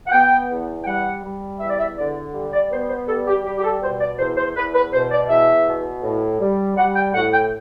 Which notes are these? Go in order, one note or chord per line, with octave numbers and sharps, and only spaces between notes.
F#5
B3 G5
E2
G5
G3 F#5
G3
E2 E5
D5
E5
D3 D5
G3
D5
B3 C5
C5
G3 A4
G4
G3 G4
G4
A4
B2 C5
D5
E2 C5
C5
E2 B4
B4
B2 C5
D5
E2 E5
B2
A2
G3
G3 F#5
G5
A2 F#5
G5